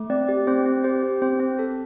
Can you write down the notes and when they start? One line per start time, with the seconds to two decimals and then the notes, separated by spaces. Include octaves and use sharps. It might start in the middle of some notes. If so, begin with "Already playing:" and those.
Already playing: A3
0.10 C4 D5
0.29 G4
0.47 C4 C5
0.66 C4
0.84 G4 C5
1.03 G4
1.22 C4 C5
1.40 C4
1.59 A4